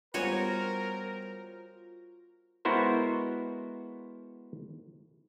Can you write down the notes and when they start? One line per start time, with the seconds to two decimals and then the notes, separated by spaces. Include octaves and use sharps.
0.14 G3 B3 F4 F#4 A#4 C5 C#5 G#5
2.65 G#3 B3 E4 F#4 A#4 C5